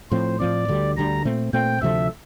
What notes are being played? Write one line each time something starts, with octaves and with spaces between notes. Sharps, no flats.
A2 F3 C4 C5
A2 F3 C4 D5
D2 D3 G3
D2 D3 G3 A#5
A#2 A3 C4
A#2 A3 C4 G5
D2 C3 F3 A3 E5